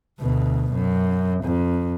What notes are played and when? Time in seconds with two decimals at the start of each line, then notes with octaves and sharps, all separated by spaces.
0.19 D2 B2
0.74 F#2
1.44 F2